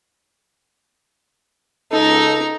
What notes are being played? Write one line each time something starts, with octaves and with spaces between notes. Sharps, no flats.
C#2 D#4 A4 A#5